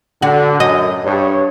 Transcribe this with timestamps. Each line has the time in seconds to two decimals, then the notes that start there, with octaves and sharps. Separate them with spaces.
0.22 D3 F#4
0.60 F#2 D#5
1.05 G2 C#5